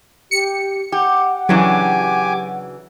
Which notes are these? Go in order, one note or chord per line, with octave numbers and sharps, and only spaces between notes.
G4 C#7
G4 F#5
C#3 E3 F#3 D4 G4 G#5 D6